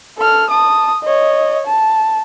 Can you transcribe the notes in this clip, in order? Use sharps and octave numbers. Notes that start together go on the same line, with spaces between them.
A4 F6
A5 D#6
C#5 D#5
A5